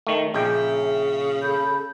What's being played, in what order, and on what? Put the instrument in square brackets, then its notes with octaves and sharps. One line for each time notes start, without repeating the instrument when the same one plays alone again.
[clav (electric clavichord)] D#3 A3
[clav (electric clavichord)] A#1 G5 [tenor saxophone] C#3 [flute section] E5
[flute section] A4 B5 G6